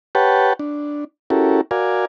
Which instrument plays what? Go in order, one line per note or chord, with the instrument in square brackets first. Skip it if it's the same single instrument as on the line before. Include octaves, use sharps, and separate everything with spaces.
[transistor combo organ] G4 B4 C#5 F#5 G5 A5
D4
C#4 E4 F#4 G4 A4 A#4
F#4 A#4 D5 F5 G#5